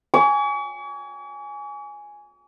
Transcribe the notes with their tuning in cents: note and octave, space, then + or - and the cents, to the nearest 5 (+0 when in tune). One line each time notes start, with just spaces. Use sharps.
G#5 +0 C#6 +45